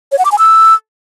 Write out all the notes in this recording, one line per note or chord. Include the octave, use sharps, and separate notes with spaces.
C#5
F#5
D6
G#5
E6